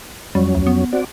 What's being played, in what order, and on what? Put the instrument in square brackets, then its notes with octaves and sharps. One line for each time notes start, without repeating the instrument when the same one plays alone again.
[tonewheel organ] F2 F#3 C#4 [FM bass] G3
[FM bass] D2
B3
[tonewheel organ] C4 F#4 D5